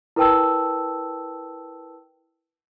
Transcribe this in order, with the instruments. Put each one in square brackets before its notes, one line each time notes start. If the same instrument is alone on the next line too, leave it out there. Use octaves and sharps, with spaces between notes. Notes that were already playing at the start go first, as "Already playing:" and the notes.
[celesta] E4 A#4 B4 G5 A5 E6